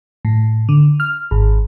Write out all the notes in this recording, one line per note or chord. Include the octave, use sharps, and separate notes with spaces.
A2
D3
F6
G#1